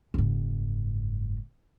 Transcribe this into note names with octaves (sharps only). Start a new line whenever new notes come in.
F#1 G#2